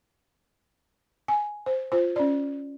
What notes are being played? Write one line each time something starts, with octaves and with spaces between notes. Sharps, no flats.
G#5
C5
F4 C5
C#4 D5